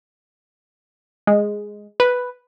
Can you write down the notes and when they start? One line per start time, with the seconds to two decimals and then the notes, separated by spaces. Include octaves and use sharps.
1.27 G#3
2.00 B4